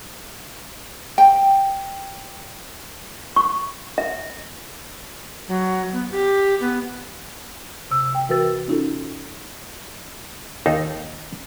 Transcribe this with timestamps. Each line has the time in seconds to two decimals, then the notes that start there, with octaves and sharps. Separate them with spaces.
1.18 G5
3.36 C#6
3.98 E5
5.48 F#3
5.93 B3
6.11 G4
6.60 B3
7.91 C3 E6
8.15 G5
8.29 E3 F#4 A#4 B4 E6 A6
8.68 C#4 D#4 F4 A4
10.66 D#2 D#4 A4 F5